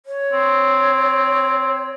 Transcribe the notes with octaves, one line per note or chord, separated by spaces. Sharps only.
C#5
C4